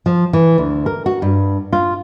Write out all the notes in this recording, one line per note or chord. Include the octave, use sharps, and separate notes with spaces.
F3
E3
D2
A#4
F#4
G2
F4